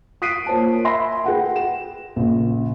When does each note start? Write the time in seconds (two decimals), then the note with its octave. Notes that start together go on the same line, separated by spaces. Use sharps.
0.22 D#6 F#6 B6 C7 D7 D#7
0.46 A#3 F4 C5 C#5 A5
0.84 E5 G#5 B5 C6 A#6
1.24 G#4 B4 F#5 G5
1.56 E7
2.16 A#1 C#3